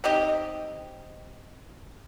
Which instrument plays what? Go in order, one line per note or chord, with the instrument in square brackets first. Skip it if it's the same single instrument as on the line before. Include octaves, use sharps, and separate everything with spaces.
[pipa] C4 D#4 G4 D#5